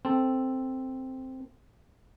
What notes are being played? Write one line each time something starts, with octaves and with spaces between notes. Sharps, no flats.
C4 A4